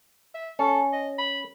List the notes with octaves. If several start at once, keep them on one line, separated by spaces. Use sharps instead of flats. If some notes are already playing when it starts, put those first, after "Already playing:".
E5
C#4 A4
D#5
B5